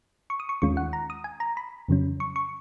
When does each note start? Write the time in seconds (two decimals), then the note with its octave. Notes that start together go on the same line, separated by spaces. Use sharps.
0.30 C#6
0.40 D#6
0.49 C#6
0.62 D#2 D#3 G#3 C#4 F4 C#6
0.77 F#5
0.93 A#5
1.10 D#6
1.24 G#5
1.40 A#5
1.57 B5
1.88 F2 C#3 F#3 C#4
2.20 C#6
2.36 C#6